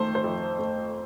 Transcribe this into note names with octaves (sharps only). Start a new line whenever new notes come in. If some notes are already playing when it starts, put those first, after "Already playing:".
Already playing: F2 D#3 A3 C5
C5
F2
A3